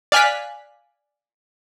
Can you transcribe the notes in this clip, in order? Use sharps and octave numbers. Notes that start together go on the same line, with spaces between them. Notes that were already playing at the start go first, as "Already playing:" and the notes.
D5 F5 G#5 F#6 B6